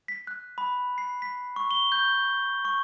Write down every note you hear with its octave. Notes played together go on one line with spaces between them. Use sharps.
B6
F#6
B5
C7
B6
C#6
G7
G6
C#6